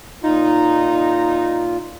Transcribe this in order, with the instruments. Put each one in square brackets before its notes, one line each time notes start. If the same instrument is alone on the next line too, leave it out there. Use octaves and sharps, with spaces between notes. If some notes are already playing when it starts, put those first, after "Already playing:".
[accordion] A#2 F4 [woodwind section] D#4